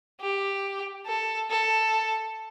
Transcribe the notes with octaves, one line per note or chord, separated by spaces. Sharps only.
G4
A4
A4